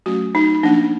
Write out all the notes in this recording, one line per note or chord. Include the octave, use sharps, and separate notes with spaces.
F#3 A3 C#4 F#4
D#4
F3 A#3 C#4 D4